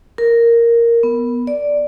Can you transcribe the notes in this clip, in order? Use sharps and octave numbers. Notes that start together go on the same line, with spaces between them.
A#4
B3
D5